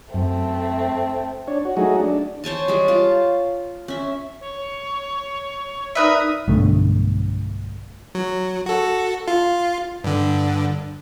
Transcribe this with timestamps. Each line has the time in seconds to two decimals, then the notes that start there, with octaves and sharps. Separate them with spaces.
0.14 F#2 A3 C4
1.48 D4 C#5
1.65 F#4
1.77 F#3 A3 D#4 F#4 G#4
2.00 D4
2.44 C5 C#5 G#5 A5
2.68 G3 G#3
2.88 F4 A5
3.88 C#4 E5
4.40 C#5
5.95 D#4 A#4 B4 D5 E5 D#6
6.48 B1 G2 D3 A3
8.15 F#3
8.66 F#4 A4
9.28 F4
10.04 G2 D3